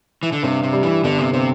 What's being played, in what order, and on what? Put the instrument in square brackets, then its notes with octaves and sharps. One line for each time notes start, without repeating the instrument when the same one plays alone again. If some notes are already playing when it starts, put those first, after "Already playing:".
[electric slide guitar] E3
D3
[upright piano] G2 [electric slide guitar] C3
[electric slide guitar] C3
[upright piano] G3
[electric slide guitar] E3
[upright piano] G1 [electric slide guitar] D3
[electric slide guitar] C3
[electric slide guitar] C3 [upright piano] C4